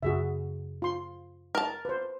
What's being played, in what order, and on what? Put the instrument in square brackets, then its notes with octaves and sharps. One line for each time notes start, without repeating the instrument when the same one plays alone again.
[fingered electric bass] F#2 C#3 [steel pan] F#4 G#4 E5
[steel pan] F4 C6
[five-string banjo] A#4 A5
[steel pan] B4 C5